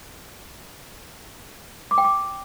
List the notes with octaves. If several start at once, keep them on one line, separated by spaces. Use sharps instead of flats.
D6
G5
D6